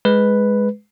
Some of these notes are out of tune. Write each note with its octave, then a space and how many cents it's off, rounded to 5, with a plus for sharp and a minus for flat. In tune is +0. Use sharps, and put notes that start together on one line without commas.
G#3 +0 B4 +0